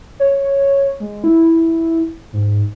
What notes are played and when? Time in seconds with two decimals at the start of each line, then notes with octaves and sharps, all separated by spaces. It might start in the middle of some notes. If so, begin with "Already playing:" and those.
0.20 C#5
1.00 G#3
1.24 E4
2.33 G#2